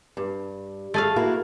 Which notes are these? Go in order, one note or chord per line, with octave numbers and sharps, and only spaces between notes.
G2
A3 G#4 F5
A#3 E4 F#4